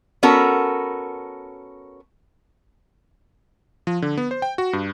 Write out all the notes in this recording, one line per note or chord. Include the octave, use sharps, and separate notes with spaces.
B3 C#4 F#4 A4 A#4
F3
D3
B3
C5
G5
F#4
G2